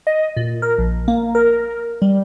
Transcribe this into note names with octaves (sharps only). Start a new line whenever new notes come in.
D#5
A#2
A#4
A#1
A#3
A#4
G3